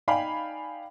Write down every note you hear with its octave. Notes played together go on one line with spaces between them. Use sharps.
D#4 D5 F5 G5 G#5 B5